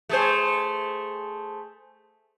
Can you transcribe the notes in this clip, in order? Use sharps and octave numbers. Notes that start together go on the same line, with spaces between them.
A3 G#4 C5